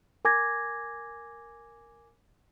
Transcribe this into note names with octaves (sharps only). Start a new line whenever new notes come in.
A#4 G#5 D6 G#6 A#6